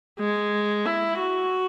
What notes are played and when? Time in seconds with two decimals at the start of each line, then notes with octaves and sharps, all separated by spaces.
0.19 G#3
0.86 E4
1.19 F#4